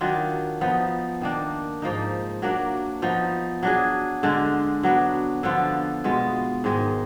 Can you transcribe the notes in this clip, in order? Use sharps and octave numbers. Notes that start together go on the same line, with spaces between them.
D#3 F#3 D4 F4
F3 B3 D#4
D#3 A#3 D4
G#2 F3 A#3 D#4
F#3 A#3 D4
F3 B3 D#4
F#3 D4 G#4
D3 G#3 D4
F#3 B3 D4
D3 F3 B3 F4
B2 G#3 B3 F4
G#2 D#3 G#3